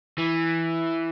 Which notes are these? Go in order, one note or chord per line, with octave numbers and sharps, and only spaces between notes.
E3